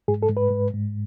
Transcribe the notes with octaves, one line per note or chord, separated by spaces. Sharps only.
G#2 G#4
A4
G#2
B4
G#2
G#2